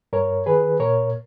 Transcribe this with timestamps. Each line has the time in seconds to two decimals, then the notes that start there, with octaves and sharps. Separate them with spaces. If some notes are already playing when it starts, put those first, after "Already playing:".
0.13 G2 A#4 C#5
0.46 D#3 G#4 B4
0.80 A#2 A#4 C#5